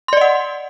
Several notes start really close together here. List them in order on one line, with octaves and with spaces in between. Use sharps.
C6 D5 D#5 F#5